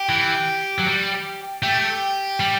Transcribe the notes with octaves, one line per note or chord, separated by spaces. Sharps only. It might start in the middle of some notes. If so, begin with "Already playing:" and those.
Already playing: G4
E3
F#3
G3
A3 G4
G3